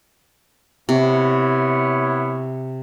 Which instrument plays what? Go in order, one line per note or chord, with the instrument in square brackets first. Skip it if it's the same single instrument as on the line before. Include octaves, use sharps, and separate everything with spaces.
[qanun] C3 [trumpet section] B3 E4 C#5